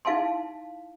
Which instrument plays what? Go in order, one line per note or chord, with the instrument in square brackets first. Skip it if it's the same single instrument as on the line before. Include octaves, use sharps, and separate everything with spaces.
[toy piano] D#4 E4 F5 G#5 A5 C6